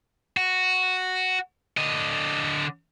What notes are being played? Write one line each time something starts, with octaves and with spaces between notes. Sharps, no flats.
F#4
D3 D#5